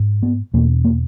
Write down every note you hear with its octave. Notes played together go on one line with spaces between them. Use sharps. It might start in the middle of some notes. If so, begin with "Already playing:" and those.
Already playing: G#2
B3
E2 B2 A#3
A#3